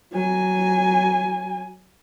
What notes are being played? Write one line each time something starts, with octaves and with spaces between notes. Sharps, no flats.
F#3 G#5